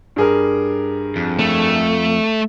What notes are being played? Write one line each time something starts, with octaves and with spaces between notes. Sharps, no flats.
G2 G#4 A#4
F2
A3